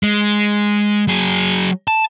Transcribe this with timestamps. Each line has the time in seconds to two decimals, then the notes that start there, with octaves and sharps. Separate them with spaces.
0.03 G#3
1.08 F#3 G#4
1.88 A5